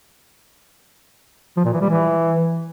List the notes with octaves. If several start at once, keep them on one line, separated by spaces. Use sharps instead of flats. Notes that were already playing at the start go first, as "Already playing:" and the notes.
F3
A#2
E3
G3
E3